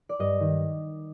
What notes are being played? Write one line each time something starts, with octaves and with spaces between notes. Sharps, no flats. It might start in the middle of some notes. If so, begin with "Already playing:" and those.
D5
G2 D#5
D#3